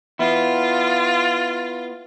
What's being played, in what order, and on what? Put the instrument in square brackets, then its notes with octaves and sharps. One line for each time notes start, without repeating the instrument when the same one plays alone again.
[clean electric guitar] B3 E4 [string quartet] F4